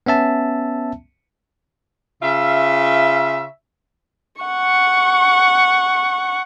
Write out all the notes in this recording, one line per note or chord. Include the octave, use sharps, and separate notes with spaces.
B3 C#4 E5 A5
C#3 F4 E5
F#5 C#6